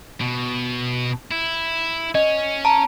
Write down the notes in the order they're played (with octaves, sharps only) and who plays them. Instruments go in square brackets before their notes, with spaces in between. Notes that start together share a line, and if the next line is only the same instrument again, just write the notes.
[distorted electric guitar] B2
E4
[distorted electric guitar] C#4 [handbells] D#5
[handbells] A5 A#5